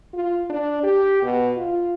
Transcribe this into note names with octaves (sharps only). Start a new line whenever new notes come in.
F4
D4
G4
B2
F4